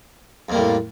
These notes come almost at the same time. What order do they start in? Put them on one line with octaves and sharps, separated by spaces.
F2 A#3 G3 A2